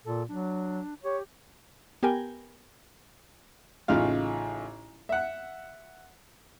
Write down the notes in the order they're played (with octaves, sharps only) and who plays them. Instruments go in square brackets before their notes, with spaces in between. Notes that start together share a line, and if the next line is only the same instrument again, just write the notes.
[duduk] A#2 [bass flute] A4
[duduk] F#3 [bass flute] D4
[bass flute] G4 [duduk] C#5
[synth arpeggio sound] B3 G4 A#4 G5 G#5
[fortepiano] A1 C#3 D#4 F4 F5
E5 F#5